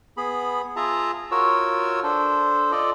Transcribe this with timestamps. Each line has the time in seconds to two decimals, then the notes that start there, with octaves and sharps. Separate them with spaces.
0.17 B3 G#4 B5
0.76 F4 G#4 E5 A5 A#5
1.31 F4 F#4 A#4 C#5 E6
2.03 D4 A4 C5
2.72 F4 A4 D5 D#5